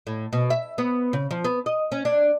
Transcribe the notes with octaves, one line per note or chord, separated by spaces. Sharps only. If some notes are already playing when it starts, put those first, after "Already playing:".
A2
B2
E5
B3
C#3
F3
B3
D#5
C#4
D4